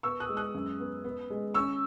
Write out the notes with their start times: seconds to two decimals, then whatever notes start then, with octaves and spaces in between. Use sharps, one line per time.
0.03 B3 C#6 E6
0.20 D#6 F#6
0.29 G#3
0.37 D#6 F#6
0.54 F#2
0.80 B3
1.04 B3
1.30 G#3
1.54 C#4 C#6 E6